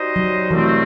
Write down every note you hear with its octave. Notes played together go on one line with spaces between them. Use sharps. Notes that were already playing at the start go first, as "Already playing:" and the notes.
Already playing: G3 D#4 F#4 C5 D#5
F#3
C2 B2 E3 A3 C4